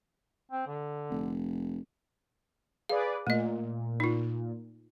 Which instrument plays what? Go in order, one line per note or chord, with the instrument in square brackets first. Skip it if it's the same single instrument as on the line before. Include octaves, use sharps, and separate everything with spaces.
[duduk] C4
D3
[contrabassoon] F1
[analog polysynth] G#4 B4 D5 [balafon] F5
[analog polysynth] A#2 [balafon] A3 D#5
[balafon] D#4 F4